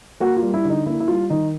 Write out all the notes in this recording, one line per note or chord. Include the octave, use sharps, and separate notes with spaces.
A#3 F#4
F4
G3
E4
D3 D#4
A#3 E4
E4
G3 F4
D#3 D#4